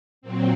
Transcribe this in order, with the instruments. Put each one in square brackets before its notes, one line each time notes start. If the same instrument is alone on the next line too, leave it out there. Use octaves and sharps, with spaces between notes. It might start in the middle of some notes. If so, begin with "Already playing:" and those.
[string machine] A#2 F#3 C4